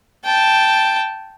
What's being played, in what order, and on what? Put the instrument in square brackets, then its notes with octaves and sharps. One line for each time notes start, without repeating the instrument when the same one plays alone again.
[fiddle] G5 A5